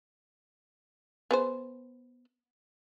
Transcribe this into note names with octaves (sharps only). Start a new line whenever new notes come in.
B3 G#4 C5